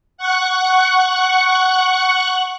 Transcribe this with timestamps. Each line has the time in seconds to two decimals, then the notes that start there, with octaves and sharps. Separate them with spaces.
0.18 F#5 C#6 F#6